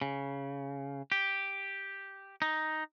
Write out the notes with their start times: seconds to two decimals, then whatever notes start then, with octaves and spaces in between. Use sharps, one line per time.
0.01 C#3
1.12 G4
2.42 D#4